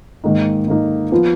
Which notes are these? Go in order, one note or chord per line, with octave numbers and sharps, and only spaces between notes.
G#2 D#3 A#3 D#4
G#2 D#3 A#3 D#4
F3 B3 F4